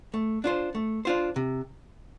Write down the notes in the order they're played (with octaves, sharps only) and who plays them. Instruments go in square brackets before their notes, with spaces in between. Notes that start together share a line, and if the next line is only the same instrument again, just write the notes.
[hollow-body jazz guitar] A3
D4 F4 C5
A3
D4 F4 C5
C3